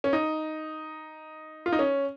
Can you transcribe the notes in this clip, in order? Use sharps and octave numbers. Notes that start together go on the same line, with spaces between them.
C#4
D#4
F4
D#4
C#4